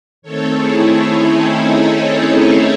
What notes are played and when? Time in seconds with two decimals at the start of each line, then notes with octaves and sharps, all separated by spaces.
0.22 D#3 A3 C4 A4 C#5
0.53 E4 G#4
0.85 E4 G#4
1.15 C#4 E4
1.47 D#4
1.78 C#4
2.08 D#4
2.39 C#4 E4